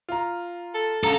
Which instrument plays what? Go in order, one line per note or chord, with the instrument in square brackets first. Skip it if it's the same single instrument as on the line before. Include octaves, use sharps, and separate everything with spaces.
[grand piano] F4 A#5
[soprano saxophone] A4
[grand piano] F#2 D3 F5 [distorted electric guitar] A4 [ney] A#5